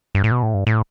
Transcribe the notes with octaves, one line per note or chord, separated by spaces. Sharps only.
G2
A2
B2
A2
G2
A2